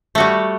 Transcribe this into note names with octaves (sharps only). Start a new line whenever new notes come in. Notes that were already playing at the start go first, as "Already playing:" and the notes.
G3 A3 F#4